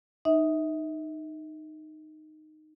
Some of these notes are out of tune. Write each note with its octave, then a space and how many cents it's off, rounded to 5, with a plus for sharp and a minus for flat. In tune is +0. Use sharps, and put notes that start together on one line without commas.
D#4 -10 E5 -35